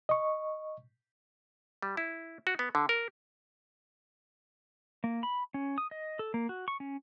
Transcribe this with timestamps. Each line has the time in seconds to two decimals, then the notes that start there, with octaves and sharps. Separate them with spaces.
0.09 D#5 C#6
1.82 G3
1.97 E4
2.47 F#4
2.59 B3
2.75 D3
2.89 A#4
5.04 A#3
5.23 B5
5.54 C#4
5.78 D#6
5.91 D#5
6.19 A4
6.34 A#3
6.49 F#4
6.68 C#6
6.80 C#4